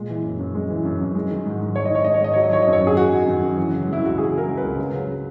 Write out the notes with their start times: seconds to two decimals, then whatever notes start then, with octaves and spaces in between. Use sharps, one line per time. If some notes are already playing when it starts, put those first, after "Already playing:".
Already playing: A#2 G#3
0.09 E3
0.24 F#2
0.40 F#2
0.55 G#3
0.70 E3
0.85 F#2
1.01 F#2
1.15 G#3
1.31 D#3
1.46 G#2
1.61 G#2
1.75 G#3 C#5
1.86 D#5
1.91 D#3 C#5
2.04 G#2 D#5
2.14 C#5
2.21 G#2 D#5
2.33 F#3 C#5
2.44 D#5
2.51 D#3 C#5
2.62 D#5
2.67 F#2
2.73 C#5
2.81 F#2
2.87 G#4
2.96 F#3 F#4
3.11 D#3
3.26 F#2
3.42 F#2
3.57 E3
3.72 C#3
3.87 G#3
3.93 E4
4.03 C#2 F#4
4.18 E3 G#4
4.33 C#3 A#4
4.48 G#3
4.57 B4
4.64 C#2
4.79 F#3
4.94 C#3